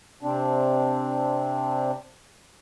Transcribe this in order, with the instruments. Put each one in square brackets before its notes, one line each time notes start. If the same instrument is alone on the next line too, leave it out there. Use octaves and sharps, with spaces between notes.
[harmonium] C3 C4 D4